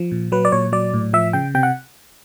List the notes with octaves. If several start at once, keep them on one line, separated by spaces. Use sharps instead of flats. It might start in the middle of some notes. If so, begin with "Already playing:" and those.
Already playing: F3
A#2
F#3 B4
D5
A#2 C#5
F#3 D5
A2
F3 E5
C#3 G5
C3 G5
F#5